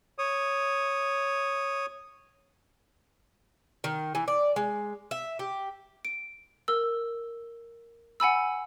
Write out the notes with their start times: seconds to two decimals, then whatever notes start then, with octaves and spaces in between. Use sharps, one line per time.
0.18 C#5 D#6
3.84 D#3
4.15 E3
4.28 D5
4.56 G#3
5.11 E5
5.39 G4
6.05 D7
6.68 A#4 E6
8.20 F#5 G#5 B5 E6